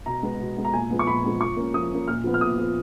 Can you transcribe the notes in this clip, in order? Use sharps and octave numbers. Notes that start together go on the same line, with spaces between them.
B2 A#5
G#3 B3
B2
G#3 B3
A#5
A#2 G#5
F3 G#3 B3
C#6
A#2 B5
F3 G#3 B3
F3 C#6
A#3 C#4
F3 D#6
A#3 C#4
A#2 F6
F3 B3
F6
A#2 D#6
F3 B3